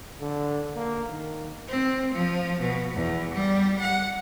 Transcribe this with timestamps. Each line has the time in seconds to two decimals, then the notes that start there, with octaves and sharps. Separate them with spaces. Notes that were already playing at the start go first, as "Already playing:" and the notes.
0.21 D3
0.74 A#3
1.09 D#3
1.68 C4
2.14 F3
2.60 B2
2.95 E2
3.34 G3
3.80 F#5